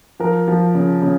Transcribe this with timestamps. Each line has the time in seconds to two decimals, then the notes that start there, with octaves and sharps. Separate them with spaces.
0.20 F3 A#4
0.48 F3
0.75 C#3
1.02 C#3